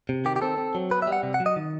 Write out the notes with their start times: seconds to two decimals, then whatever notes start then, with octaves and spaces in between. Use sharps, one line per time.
0.09 C3
0.25 D#3 G4
0.36 G4
0.42 C4 A4
0.58 C4
0.75 F#3
0.91 B3 B4
1.02 E5
1.07 G3
1.12 F#5
1.23 C3
1.34 F#5
1.40 F#3
1.46 D#5
1.56 D#3